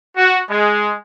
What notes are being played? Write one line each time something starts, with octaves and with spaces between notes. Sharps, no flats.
F#4
G#3